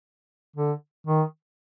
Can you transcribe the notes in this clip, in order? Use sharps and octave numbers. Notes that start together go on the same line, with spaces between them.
D3
D#3